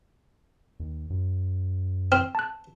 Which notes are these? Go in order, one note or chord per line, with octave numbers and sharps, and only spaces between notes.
D#2
F#2
C4 F6
A5 F#6